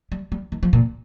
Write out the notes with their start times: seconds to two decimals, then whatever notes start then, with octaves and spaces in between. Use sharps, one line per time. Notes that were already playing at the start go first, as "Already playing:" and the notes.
0.12 G3
0.32 G3
0.52 D#3
0.63 F3
0.73 A#2